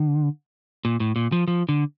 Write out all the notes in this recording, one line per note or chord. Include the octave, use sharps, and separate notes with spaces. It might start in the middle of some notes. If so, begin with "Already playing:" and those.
Already playing: D3
A#2
A2
A#2
F3
F3
D3